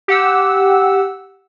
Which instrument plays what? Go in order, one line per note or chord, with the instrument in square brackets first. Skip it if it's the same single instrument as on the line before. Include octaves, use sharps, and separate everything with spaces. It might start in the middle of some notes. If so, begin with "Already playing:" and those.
[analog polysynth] G4 F#5 E6